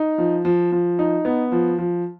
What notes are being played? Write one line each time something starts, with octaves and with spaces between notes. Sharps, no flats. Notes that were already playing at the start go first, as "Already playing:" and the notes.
Already playing: D#4
F3
F3
F3
D#4
B3
F3
F3